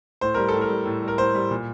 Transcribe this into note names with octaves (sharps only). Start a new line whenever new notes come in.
A2 C5
G3 A#4
A4
A2
A#4
G3
A2
G3
A#4
A2 C5
G3
A#2